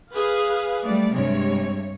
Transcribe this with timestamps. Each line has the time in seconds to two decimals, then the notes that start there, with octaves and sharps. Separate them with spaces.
0.12 G#4 B4 F5
0.84 G3 A3 D5
1.14 G2 C3 G#3 C#5